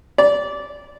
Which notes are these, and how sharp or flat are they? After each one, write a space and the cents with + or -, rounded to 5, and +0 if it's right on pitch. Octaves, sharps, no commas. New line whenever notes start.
D5 -20